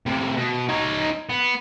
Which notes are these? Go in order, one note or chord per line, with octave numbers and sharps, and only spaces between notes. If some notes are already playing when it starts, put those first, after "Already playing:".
A2 C3
B2
D#4 C#5
B3